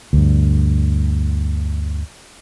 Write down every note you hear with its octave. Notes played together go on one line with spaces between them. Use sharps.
D2 G2